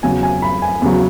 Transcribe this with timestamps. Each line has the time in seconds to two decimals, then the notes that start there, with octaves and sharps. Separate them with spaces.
0.03 E2 C#3 F#3 G#5
0.23 G#5
0.42 B5
0.62 G#5
0.82 E2 C#3 F#3